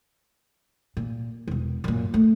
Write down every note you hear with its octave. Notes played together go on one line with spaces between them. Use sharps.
A#2
E1 B2
F#2 A#2
A3